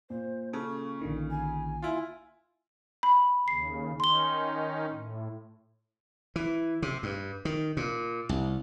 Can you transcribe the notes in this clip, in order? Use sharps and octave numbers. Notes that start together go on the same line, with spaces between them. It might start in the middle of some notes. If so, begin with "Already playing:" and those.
A#2 C5
C#3 A4 C#6
A#1 D3 D#3
G#5
E4 F4
B5
D#2 C#3 C7
D#3 C#4 D#4 C6 G7
A2
E3
C3
G2
D#3
A#2
C2